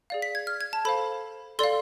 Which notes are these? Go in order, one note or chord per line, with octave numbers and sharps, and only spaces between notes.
G#4 D5 F5
B6
G#6
F6
G#6
A5
A4 C5 F5 B5
A4 D5 F5 C6